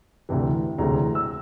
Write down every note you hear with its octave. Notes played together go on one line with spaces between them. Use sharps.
D2 C3 E3
E1 D2 C3 E3 A#5
E6